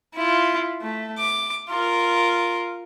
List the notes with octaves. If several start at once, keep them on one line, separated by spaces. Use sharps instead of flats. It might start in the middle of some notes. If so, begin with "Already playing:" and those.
E4 F4
A3
D6
F4 A#4